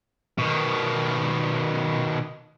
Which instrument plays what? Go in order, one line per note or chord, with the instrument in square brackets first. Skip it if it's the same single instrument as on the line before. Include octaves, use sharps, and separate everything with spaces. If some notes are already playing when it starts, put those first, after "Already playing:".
[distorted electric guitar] B2 D#3